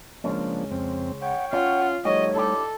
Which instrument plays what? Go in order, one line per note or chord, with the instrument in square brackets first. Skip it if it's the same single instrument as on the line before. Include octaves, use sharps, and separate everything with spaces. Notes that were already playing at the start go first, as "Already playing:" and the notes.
[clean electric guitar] C#2 G#3 C#4 [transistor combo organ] F3 A#3 D4
[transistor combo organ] F2 C4
[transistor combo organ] C#5 G5 [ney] F#5
[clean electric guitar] C#4 [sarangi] F4 [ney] F#5
[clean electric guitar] F3 F#4 [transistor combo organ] G3 A3 D#4 [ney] C#5 [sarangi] D#5
[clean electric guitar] D4 E4 G4 [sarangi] A4